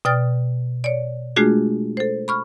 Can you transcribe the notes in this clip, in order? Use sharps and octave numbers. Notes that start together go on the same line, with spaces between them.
B2 D5 G5 D#6 F6 A6
C#5 D5
G#3 A3 D4 F4 F#4 G#4
A4 C5
B5 C#6 F6